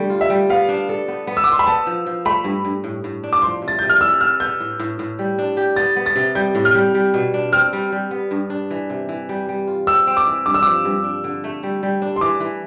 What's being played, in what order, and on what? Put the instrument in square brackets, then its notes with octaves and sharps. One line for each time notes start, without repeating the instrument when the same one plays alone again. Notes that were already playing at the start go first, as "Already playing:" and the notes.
Already playing: [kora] D3 G3 A3
F4
[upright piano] E5
[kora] G3
[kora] B3 [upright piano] F5
[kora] D4
A4
B3
B3
[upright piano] E6
D6
[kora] B3 [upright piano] C6
[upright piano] B5
[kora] B3 [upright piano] A5
[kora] F3
F3
[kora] A3 [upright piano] B5
[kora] G2
G2
A2
A2
D4
[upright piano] D6
[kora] F3 [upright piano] C6
[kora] C3
[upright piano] A6
[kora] C3 [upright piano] G6
[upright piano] F6
[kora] E3 [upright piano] E6
[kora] B3 [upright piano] F6
[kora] B3 [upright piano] G6
[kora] A2
A2
A2
G3
D4
G4
[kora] B3 [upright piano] A6
[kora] B3
[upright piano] A6
[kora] C3
[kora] G3 [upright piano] G6
[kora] A2
[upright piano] F6
[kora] G3
G3
B2
D4
[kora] C4 [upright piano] F6
[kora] G3
G3
B3
G2
D4
E3
C3
E3
G3
G3
F4
[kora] C4 [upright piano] E6
[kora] C4
[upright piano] D6
[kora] E3
[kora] G2 [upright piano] D6
[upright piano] E6
[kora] F3 [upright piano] D6
[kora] G2
D4
D3
A3
G3
G3
D4
[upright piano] C6
[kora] E3 [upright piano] D6
[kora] E3